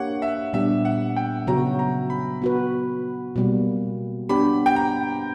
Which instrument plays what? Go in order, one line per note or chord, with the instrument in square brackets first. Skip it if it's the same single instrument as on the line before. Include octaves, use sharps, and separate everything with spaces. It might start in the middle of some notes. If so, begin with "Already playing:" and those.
Already playing: [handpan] A#3 D4 G4 C#5 [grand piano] F#5
[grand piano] E5
[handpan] A#2 G3 B3 D4 G4 [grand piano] E5
[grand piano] F#5
G5
[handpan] C#3 F#3 B3 F#4 [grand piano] A#5
[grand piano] A#5
B5
[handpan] B3 F#4 B4
B2 G3 A#3
[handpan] B3 D4 G4 [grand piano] B5
[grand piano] G5
A#5